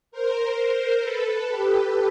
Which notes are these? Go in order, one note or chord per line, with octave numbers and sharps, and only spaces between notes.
A#4 C5
A#4 C5
A4 B4
G4 A4